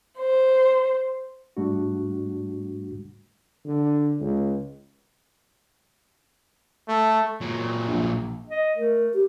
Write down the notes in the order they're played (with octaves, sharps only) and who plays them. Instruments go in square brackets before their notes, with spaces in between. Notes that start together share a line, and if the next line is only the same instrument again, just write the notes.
[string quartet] C5
[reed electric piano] G#2 G3 A3 D4 F#4
[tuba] D3
C#2
[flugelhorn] A3
[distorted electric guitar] A#2 F#3
[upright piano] A#1
[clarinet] D#5
[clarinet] A3 [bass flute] A#4
[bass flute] G4